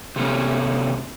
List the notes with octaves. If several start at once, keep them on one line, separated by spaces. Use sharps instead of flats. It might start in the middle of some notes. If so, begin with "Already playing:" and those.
C3 A3 B3 C#4